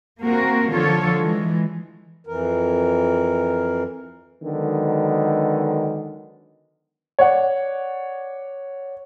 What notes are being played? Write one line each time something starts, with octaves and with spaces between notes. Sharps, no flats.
A#3 C4 F#4 A#4
D3 F3 F4 A4 C#5
E3 G#3
F2 E3 A#4
D3 D#3 F#3 G#3 B3
C#5 D5 F#5